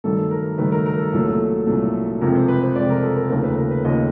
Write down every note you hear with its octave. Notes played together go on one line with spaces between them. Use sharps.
G2 D#3 F#3 A3 A4
A#4
G2 D#3 F#3 A3 B4
A#4
A#4
A4
C2 A#2 F#3 A3 A4
C2 A#2 F#3 A3
F2 C3 F3 G#3 A#4
C5
B4
C5
F2 C3 F3 G#3 D5
A#4
A4
A#4
D#2 C#3 F3 A3 A#4
B4
A#4
B4
D#2 C#3 F3 A3 D#5